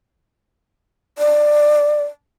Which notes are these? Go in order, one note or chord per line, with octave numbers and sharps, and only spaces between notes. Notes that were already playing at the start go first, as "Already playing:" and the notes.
D5